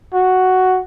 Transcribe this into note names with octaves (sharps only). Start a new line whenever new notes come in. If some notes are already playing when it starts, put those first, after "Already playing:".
F#4